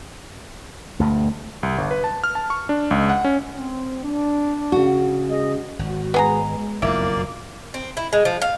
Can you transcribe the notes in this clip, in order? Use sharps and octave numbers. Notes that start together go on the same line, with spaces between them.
D2 G2 B2 A3
C2
G1
B4
A5
F6
A5
C#6
D4
C#2
F#5
C#4
C4
D4
C#3 F#4
G#3 D#5
G#1 F#4
G#3 B3 G#4 A#5
F#1 B1 F2 B2 A#3 E4 F4 D5
C4
E4
G#3
F3
F5